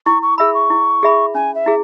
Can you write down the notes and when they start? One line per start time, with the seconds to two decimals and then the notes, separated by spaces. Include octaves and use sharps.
0.06 E4 C#6
0.22 C#6
0.38 G#4 E5 B5 E6
0.54 C#6
0.70 E4
1.03 G#4 E5 B5
1.34 C#4 G#5
1.55 E5
1.66 E4 G#4